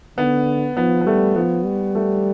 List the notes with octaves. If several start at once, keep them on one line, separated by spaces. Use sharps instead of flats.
D3 B3
F3 B3
B3
G3 A3
F3 B3
G3
A3